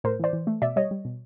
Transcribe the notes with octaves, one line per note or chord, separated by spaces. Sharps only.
A2 A#4 C5
E3 C5 D5
E3
A3
B2 D5 E5
G3 C#5 D#5
G3
B2